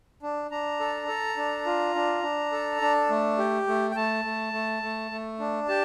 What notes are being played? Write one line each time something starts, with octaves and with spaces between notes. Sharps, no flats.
D4
D4 A#5
A4
A4
D4
F4
D4
D4
A4
D4
A3
G4
A3
G5
A3 A5
A3
A3
A3
A3
D4
G4 A5